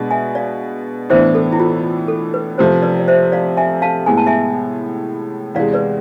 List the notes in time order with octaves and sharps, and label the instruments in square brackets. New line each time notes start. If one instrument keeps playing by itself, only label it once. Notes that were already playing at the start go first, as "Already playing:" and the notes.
Already playing: [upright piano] B2 G#3 D4
[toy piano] E5 G#5
D5 F5
[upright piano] A2 E3 B3 D4 [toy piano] C5 E5
[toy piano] A4
E4
F4
A4
B4
[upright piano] C3 F3 A3 [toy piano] C5
[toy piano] B4 D5
D5
C5 E5
D5 F5
E5 G#5
F5 A5
[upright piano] A2 G#3 B3 [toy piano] G#5
[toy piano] A5
E5 G#5
[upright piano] E2 C3 G#3 [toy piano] D5 F5
[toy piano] B4 D5